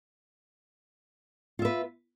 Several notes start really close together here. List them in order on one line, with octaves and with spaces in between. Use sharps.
F4 E5 B4